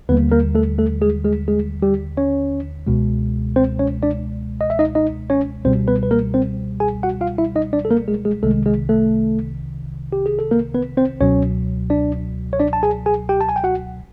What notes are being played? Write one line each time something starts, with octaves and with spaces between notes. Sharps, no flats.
D#2 D3 G3 A#3 B3 B4
A#3 A#4
A3 A4
A3 A4
G#3 G#4
G#3 G#4
G#3 G#4
G3 G4
C#4 C#5
C#2 B2 G#3
C4 C5
C#4 C#5
D4 D5
D#5
E5
D#4 D#5
D#4 D#5
C#4 C#5
C#2 B2 G3 C4 C5
B3 B4
B4
A#3 A#4
C4 C5
G#4 G#5
F#4 F#5
F4 F5
E4 E5
D#4 D#5
D4 D5
A4
A#3 A#4
G#3 G#4
G#3 G#4
C2 C3 D#3 G#3 A3 A4
G#3 G#4
A3 A4
G4
G#4
A4
A#3 A#4
B3 B4
C4 C5
C#2 B2 F#3 C#4 C#5
D4 D5
C#5
D4 D5
A5
G#4 G#5
G#4 G#5
G4 G5
A5
G#5
G5
F#4 F#5